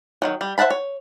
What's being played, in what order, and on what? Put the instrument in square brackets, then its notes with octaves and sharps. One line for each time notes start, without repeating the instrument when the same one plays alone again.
[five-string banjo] D#3 E3 F#3
G3
C5 E5 F#5 A5 B5
C#5